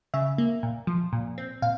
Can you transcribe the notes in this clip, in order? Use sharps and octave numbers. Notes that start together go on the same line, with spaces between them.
C#3 E5
A#3
A#2
F3
A#2
C4
A#2 F5